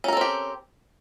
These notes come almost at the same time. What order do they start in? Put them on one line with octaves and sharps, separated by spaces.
C#4 A#4 A4 C4 G4